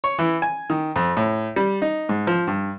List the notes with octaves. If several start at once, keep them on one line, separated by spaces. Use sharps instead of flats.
C#5
E3
G#5
D#3
F2
A2
G3
D#4
G#2
F3
G2